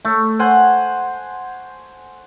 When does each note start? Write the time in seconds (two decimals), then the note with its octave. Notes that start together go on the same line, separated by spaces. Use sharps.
0.05 A3
0.39 C5 F#5 G#5